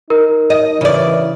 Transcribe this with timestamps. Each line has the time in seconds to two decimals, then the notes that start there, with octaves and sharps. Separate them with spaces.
0.10 D#4 A#4
0.50 D#5
0.81 C#3 E3 D5